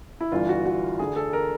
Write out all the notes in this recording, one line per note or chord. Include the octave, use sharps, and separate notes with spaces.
E4
G1 G2 E3 F4
F#4
F#4
D2 D3 G#4
A4
A#4